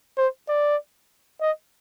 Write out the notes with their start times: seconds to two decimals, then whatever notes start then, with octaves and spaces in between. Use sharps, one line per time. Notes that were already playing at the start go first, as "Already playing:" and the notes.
0.18 C5
0.48 D5
1.41 D#5